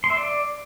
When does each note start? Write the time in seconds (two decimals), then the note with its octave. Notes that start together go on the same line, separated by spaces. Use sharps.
0.04 C6
0.10 E5
0.16 D5